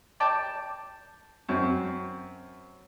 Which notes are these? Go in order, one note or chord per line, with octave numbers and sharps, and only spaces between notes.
D5 G5 A5 D6
F#2 C4